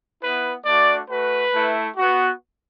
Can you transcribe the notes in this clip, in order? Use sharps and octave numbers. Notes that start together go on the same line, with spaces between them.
B3 E4 B4
A3 D4 F#4 D5
A3 F#4 B4
A3 E4
B3 F#4